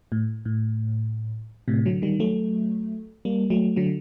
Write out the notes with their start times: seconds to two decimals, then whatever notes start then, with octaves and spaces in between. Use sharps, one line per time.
0.12 A2
0.45 A2
1.68 A2 C3
1.85 D3 F#3
2.02 D#3 G3
2.20 F#3 A3
3.25 G3 A#3
3.50 F#3 A3
3.76 D3 F#3